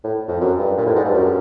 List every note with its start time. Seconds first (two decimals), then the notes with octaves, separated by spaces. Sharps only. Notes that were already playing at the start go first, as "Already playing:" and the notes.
0.04 A2
0.28 F2
0.41 F#2
0.59 G2
0.77 A#2
0.87 A2
0.95 G#2
1.05 G2
1.14 F#2